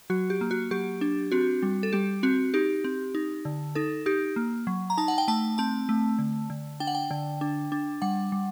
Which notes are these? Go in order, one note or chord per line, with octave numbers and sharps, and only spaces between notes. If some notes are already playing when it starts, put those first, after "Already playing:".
F#3 F#4
G4
A#3
F#4
F#3 G4
D4
C4 F#4
G3
A4
G3 G4
C4 F#4
D#4 G4
C4
D#4
D3
D#4 A4
D#4 G4
A#3
F#3
A#5
D#4 A5
F#5
G5
A3 A5
C4 A5
A3
D3
D3
D4 G5
F#5
G5
D3
D4
D4
G3 F#5
G3